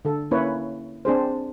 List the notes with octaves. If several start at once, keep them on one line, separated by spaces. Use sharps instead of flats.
D3 A4
A#3 C#4 E4 B4 C#5
C4 D4 G#4 C5